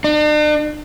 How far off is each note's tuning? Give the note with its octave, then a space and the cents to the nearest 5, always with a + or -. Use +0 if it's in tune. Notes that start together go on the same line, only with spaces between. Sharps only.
D4 +45